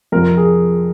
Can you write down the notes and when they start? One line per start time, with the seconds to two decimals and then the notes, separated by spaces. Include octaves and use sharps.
0.12 F2 C3 F3 A#4
0.37 G#4